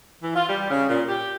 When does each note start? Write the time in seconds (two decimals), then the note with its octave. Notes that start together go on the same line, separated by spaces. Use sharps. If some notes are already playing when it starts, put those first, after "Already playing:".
0.22 E3
0.35 F4
0.48 G3
0.70 C#3
0.89 A#2
1.07 G4